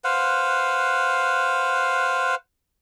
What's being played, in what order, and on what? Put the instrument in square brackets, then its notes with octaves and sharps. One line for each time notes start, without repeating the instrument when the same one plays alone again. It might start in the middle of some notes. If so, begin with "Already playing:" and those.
[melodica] B4 C5 F5 F#5